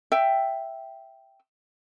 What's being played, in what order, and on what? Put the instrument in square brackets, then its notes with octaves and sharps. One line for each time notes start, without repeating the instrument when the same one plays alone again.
[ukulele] E5 G5